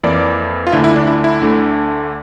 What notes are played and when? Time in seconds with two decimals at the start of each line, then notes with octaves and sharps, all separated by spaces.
0.03 F2 E3 A#3 D5
0.67 F4
0.72 D2 D3 A3 E4
0.84 E4
0.96 D4
1.07 E4
1.24 E4
1.42 D2 D3 A3